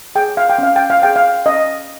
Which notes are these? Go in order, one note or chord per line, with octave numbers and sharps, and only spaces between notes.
G#4 C#5 G5
F5
G5
C#4 F5
G5
F5
G#4 C#5 G5
F5
C#4 D#5